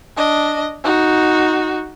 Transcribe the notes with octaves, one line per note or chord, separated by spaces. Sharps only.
D4 D#5
D#4 F#4